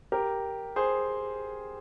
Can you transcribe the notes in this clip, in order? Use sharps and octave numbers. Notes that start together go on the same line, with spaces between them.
G4 A#4
G#4 C5